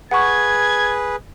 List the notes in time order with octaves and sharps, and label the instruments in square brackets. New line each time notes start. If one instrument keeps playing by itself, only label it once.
[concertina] G#4 B4 [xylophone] F#5 C#6 [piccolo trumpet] G#6